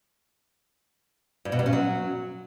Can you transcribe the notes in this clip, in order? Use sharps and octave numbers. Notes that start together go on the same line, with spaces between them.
G2
B2
G2
C#4
F#3